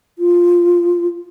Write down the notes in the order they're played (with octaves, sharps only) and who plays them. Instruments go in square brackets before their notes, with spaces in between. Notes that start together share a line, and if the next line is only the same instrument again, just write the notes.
[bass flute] F4